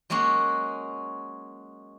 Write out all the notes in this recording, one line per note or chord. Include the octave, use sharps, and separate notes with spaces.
F#3 G#3 A#3 C#4 F#4